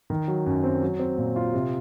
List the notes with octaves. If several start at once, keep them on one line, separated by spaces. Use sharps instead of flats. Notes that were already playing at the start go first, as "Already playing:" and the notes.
D#3
F#3
F#2
C4
F#3
C4
A#2
F4
C3